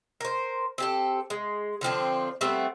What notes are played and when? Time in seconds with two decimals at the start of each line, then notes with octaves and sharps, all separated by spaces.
0.21 A#4 C5
0.78 C4 G4 A4
1.30 G#3
1.81 D3 F3 C4 D4
2.41 G3 A3 B3 C4